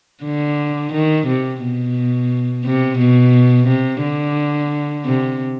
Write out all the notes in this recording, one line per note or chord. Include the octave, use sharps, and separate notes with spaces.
D3
D#3
C3
B2
C3
B2
C3
D3
C3